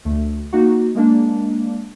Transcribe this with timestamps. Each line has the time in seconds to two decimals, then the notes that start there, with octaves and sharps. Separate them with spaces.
0.05 D2 A3
0.53 A#3 D#4 F#4
0.95 G#3 A#3 D4